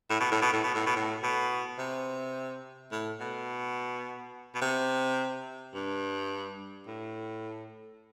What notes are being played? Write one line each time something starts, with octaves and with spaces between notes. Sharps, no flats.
A2
B2
A2
B2
A2
B2
A2
B2
A2
B2
C3
A2
B2
B2
C3
G2
A2